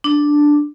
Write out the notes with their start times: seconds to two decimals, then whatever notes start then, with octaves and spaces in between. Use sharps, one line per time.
0.04 D4